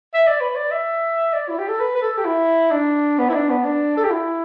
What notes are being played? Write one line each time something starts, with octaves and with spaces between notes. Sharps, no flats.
E5
D5
B4
D5
E5
D5
E4
G4
A4
B4
B4
A4
G4
E4
D4
B3
E4
D4
B3
D4
A4
G4
E4